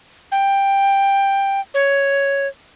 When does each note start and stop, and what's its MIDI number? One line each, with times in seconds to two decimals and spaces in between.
0.32 1.60 79
1.74 2.47 73